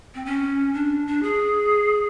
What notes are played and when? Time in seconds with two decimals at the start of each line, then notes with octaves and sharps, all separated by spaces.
0.15 C4
0.26 C#4
0.74 D4
1.07 D4
1.23 G#4